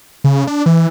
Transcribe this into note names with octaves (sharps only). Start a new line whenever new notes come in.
C#3
D4
E3